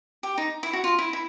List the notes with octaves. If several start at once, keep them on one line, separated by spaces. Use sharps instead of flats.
G4
D#4
E4
F#4
F4
E4
E4